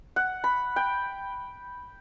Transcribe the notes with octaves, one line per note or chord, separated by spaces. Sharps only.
F#5
B5
G5